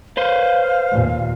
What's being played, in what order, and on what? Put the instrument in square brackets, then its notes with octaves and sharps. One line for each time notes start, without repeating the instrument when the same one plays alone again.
[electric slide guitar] B4 C5 [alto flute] F5
[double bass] D#2 A#2